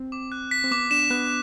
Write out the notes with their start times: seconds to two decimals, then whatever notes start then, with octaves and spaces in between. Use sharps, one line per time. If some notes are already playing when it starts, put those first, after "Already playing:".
Already playing: C4
0.12 D6
0.32 F#6
0.51 B6
0.64 C4
0.71 B3 D6
0.91 D4 E7
1.10 B3 F#6